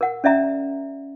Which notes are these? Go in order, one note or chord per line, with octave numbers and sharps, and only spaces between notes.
A#4 F#5
C#4 D5 E5 A#5